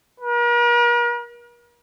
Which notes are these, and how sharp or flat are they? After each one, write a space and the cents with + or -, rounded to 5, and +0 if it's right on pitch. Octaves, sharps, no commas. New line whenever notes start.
A#4 +45